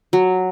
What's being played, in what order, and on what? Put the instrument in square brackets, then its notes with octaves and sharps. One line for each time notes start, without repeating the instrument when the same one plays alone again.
[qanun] F#3